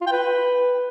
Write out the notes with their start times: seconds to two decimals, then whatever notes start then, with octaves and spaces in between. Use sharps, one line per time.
0.01 F4
0.06 G5
0.12 B4